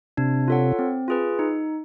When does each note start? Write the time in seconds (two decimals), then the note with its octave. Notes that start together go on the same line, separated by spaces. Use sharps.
0.17 C3 D4
0.48 F4 A4 C#5 F#5
0.79 C4
1.08 F4 G#4 B4
1.39 D#4